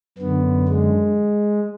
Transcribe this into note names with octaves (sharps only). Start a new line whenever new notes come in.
F#2 D3 B3
G#3